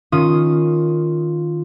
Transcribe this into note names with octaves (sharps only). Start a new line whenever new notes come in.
D#3 C#4 F4 D#6